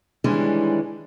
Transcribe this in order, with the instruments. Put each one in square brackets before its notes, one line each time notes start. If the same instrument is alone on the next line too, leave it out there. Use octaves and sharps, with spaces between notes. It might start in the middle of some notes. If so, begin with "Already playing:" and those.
[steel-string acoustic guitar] D#3 E3 G3 G#3 C#4 D4